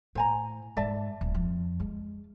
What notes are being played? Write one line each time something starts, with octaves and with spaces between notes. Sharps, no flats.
A2 C5 G#5 A#5
G#2 D5 E5 A5
D1
F2
G#3